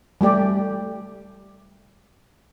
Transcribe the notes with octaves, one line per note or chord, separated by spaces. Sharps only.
G3 A3 G4 D5